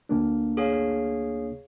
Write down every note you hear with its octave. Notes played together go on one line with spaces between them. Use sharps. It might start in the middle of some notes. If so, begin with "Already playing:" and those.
D2 A#3 D4
G#4 C#5 F5